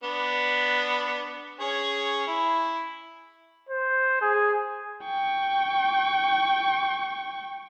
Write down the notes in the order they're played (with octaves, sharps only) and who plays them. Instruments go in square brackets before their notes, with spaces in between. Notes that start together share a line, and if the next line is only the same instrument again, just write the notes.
[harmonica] B3 D4
C#4 G#4 C#5
E4
[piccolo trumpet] C5
G#4
[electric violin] G5 C#6